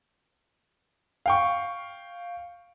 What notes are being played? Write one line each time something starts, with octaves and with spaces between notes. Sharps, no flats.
F5 G5 C#6